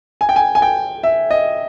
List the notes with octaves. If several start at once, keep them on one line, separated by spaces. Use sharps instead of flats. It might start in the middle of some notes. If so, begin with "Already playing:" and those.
G#5
G5
G#5
G#5
G5
E5
D#5